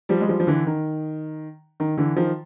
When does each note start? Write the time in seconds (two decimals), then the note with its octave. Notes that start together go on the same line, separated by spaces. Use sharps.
0.09 F3 G3
0.21 G#3
0.28 F3 G3
0.40 F3
0.47 D3 E3
0.67 D#3
1.80 D#3
1.97 D3 E3
2.16 D#3 F3